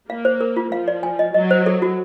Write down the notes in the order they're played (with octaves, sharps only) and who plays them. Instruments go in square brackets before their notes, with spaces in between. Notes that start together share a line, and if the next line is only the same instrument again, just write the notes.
[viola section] A#3 [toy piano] F5
[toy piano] C5
A#4
F4
[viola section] F3 [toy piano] F5
[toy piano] D5
G#5
D#5
[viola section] F#3 [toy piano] D#5
[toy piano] C5
A4
F#4